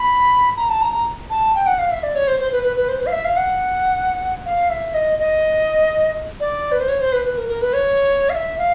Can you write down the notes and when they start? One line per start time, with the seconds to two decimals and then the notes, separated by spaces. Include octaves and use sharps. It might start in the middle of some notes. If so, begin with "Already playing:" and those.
Already playing: B5
0.57 A#5
0.69 A5
0.82 A#5
0.93 A#5
1.30 A5
1.55 G5
1.67 F#5
1.79 F5
1.92 E5
2.03 D5
2.15 C#5
2.27 C5
2.40 C5
2.52 B4
2.63 B4
2.76 B4
2.88 C5
3.00 B4
3.06 F5
3.12 E5
3.25 F5
3.37 F#5
4.46 F5
4.70 E5
4.94 D#5
5.19 D#5
6.40 D5
6.72 B4
6.80 C5
6.89 C#5
7.01 C5
7.13 B4
7.25 B4
7.37 A#4
7.49 A#4
7.62 B4
7.73 C#5
8.30 F5
8.34 E5
8.58 F5